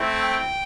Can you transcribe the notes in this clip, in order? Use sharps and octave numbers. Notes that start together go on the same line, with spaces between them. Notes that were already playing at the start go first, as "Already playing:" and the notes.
Already playing: A3 C4 E4
G5